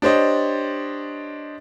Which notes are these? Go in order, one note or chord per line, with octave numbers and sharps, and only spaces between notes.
D4 G4 C5 C#5 D#5